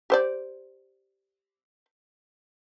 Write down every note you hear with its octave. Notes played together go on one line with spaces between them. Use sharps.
G4 C5 D5